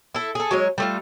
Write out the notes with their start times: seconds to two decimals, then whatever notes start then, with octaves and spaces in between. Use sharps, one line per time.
0.15 E4 A4
0.35 G#4 A4
0.51 F#3 G#3 C#5
0.78 G3 A3 F4